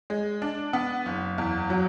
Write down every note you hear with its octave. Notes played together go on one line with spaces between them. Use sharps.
G#3
D4
B3
F#1
E2
F#3